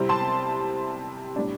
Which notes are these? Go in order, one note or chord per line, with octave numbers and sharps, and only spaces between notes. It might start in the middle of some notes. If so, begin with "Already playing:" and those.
Already playing: C3 G3 C4 E4
A5 C6
A2 G3 D4